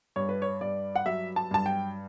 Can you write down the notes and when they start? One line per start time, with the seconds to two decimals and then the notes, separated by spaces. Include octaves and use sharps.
0.16 G2 C#5
0.29 B4
0.42 C#5
0.61 G2 D5
0.96 F#5
1.06 F#3 E5
1.36 A5
1.51 G2 A5
1.66 G5